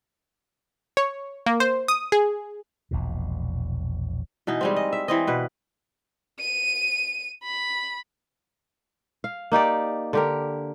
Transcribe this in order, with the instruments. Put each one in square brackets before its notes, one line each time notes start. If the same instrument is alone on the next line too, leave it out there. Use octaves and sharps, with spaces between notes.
[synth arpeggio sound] C#5
A#3
C5
D#6
G#4
[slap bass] E1 A#1 E2 B2
[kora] B2 E3 D#4
G3 G#3 C4
D#5
E5
E3 C4 D#5
B2 B4
[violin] D#7
B5
[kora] F5
A#3 D#4 G4 D5
D3 G4 A#4